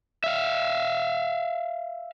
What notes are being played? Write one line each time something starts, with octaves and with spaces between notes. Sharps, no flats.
E5 F5